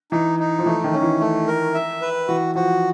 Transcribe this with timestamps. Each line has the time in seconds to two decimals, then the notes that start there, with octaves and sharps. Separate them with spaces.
0.12 E3 D#4
0.39 D#4
0.59 F3
0.66 E3 A3
0.84 D#3
0.93 C#4
1.02 E3
1.20 A3
1.48 A#4
1.74 E5
2.02 B4
2.28 E3 F#4
2.55 F3 F#4